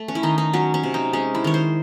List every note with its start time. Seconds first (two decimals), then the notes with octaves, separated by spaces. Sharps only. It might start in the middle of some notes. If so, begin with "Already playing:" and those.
Already playing: A3
0.08 C#4
0.15 E4
0.23 D#3 D#4
0.38 D#4
0.53 F#3 C#4
0.74 C#4
0.83 C3
0.94 D#4
1.13 G#3 C#4
1.35 E4
1.44 D#3 C#5
1.54 C5